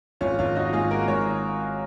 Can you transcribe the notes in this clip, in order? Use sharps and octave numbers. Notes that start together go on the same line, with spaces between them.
G#1 C#4 F4
G#1 C#4 F4
G#1 D#4 F#4
G#2 F4 G#4
A#3 F#4 A#4
G#1 A#4 C#5